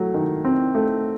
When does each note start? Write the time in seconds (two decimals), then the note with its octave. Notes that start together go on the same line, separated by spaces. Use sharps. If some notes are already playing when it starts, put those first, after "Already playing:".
Already playing: F#3 A3
0.14 D#3
0.45 C4
0.75 A3